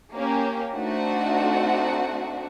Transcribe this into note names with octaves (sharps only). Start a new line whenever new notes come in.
A#3 C#4 G4
A3 C4 D4 D#4 F#4 F#5